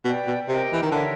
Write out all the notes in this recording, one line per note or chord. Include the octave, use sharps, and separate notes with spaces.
B2 B4 D5 G5
B2
C3 G4 A#4 D#5 G5
E3
D#3
D3 A#4 C#5 E5